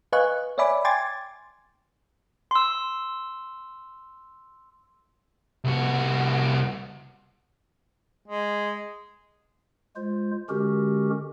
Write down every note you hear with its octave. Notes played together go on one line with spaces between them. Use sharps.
B4 D#5 F5 G#5 C#6 F#6
C#5 D5 E5 G#5 B5 D6
G5 G#5 C6 D6 G#6 A6
C6 E6
C2 F#4
G#3
G#3 F4 C5
D3 G#3 C#4 F#4 G4 A#4